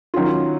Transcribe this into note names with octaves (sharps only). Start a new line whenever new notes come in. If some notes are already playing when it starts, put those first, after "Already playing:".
D#3 F#3 C#4 F4